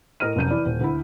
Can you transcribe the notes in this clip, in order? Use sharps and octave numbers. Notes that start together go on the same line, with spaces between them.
A2 A#4 D#5 F6 D#7
F1 F#2 G6 D#7
E3 E4 D5
D#1
D2 E4